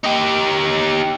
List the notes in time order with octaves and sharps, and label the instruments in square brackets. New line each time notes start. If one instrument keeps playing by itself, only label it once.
[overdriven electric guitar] D#4 G4